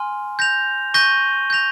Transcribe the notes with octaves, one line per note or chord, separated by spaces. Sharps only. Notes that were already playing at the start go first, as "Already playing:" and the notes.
Already playing: G#5 C6 F6
G6 A#6 F7
C#6 G6 A#6 D#7 G7
G6 A#6 F7